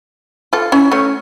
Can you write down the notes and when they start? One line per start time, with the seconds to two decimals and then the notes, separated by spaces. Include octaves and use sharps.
0.53 F4 A4
0.72 C#4 E4
0.92 A3 C#4